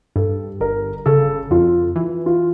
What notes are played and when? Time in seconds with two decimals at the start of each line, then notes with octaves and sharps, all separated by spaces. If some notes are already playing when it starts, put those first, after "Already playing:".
0.16 G2 A4
0.60 G1 A#4
1.06 C#3 A4
1.51 F2 F4
1.96 E3 F4
2.26 F4